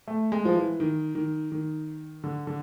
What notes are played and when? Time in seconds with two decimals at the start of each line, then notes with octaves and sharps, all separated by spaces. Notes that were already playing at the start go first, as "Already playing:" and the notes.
0.08 A3
0.32 G#3
0.45 F3
0.55 E3
0.80 D#3
1.15 D#3
1.52 D#3
2.24 D3
2.47 D3